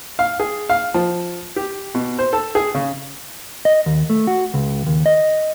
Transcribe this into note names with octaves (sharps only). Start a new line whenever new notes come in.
F5
G#4
F5
F3
G4
B2
C5
A4
G#4
C#3
D#5
D#2
A3
F#4
C#2
D#2
D#5